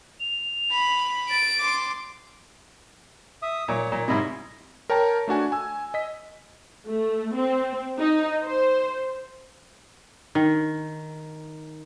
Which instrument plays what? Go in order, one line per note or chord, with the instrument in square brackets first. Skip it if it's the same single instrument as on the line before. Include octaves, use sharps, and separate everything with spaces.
[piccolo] F7
[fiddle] B5
[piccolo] A6 [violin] D7
[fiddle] C6 D6
[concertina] E5 D#6
[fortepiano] A#2 [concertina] C#5
[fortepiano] A#2
[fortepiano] G#2 C3 [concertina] E4 D#5
[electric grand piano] A#4 C#5 G5 A5 A#5
A3 D4 F#4 G#5
G#5 E6
D#5 B6
[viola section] A3
C4
D#4
C5
[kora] D#3